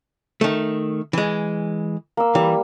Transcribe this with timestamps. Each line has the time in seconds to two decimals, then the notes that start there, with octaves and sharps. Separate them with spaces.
0.41 D#3 A3
1.13 E3 G#3
2.17 A#3 E6
2.35 E3 G3